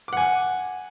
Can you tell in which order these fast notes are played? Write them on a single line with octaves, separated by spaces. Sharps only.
D6 F#5 G#5